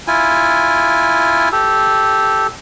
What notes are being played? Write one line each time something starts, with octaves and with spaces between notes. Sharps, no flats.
E4 F4 G#5
G4 A4